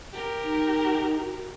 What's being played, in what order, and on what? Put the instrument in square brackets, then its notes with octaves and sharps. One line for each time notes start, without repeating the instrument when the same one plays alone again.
[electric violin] G4 A#4
[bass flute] D#4
F#4